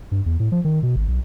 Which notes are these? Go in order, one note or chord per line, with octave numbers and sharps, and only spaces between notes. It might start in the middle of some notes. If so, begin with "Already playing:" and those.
G2
E2
A2
F3
D#3
B2
G#1
B1